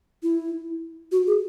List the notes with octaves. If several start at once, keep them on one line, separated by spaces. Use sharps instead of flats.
E4
F#4
G#4